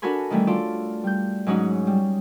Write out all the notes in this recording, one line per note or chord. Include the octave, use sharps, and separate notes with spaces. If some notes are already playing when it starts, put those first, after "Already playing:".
D4 F#4 A4 A#4 G#5 B5
D#3 E3 G3 A3 C#4
F4 A4 D5
G3 G6
G#2 F#3 G#3 C#4 D#4 F#4
G3